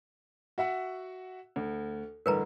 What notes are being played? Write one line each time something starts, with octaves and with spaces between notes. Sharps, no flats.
F#4 E5 F#5
D2
A1 G2 D3 A#4 B4 A#5